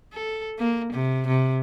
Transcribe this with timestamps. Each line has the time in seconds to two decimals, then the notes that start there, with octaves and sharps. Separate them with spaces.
0.13 A4
0.59 A#3
0.93 C3
1.27 C3